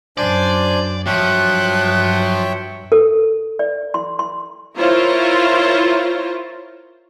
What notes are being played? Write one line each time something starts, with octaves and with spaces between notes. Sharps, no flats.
F#2 D4 C5 D5 G#5
G2 F3 F#3 C#5 E5 G5 F#6
A4
D5
C6
C6
E4 F4 A#4 C5 C#5